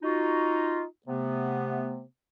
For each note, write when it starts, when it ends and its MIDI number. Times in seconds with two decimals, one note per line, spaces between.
0.02 0.84 63
0.02 0.84 65
0.02 0.84 66
1.07 2.03 48
1.07 2.03 57
1.07 2.03 59